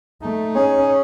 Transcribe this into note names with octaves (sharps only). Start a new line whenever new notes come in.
A3 D#4
C#4 G#4
C#4